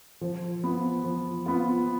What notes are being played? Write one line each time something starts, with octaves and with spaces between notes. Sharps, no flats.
F3
B3 F4
F3
B3 F4